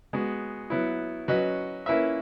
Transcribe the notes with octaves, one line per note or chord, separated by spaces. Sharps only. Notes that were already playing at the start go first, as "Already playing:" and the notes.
G#3 B3 F#4
F#3 B3 E4
F#3 C#4 F#4 B4 D#5
A#3 C#4 E4 B4 E5